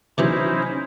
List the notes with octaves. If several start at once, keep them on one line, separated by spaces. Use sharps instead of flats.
C3 E3 F#3 C#4 D#4 E4 C5